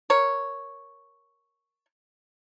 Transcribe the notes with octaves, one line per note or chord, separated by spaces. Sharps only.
A#4 C#5